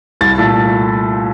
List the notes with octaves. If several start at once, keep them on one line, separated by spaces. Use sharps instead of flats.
C2 A6
A#2 A3